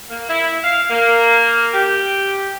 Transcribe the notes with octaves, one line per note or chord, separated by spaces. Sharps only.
A#3
E4
F5
A#3
G4